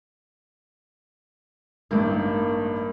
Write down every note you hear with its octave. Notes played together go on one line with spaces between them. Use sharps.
A1 G2 D#3 A#3